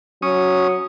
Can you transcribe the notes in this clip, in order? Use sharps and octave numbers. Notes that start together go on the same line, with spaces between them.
F#3 C#4 D#6